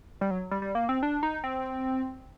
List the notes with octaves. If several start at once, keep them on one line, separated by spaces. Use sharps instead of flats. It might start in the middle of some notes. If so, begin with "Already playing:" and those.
G3
F#3
G3
G3
A#3
C4
D4
D#4
C4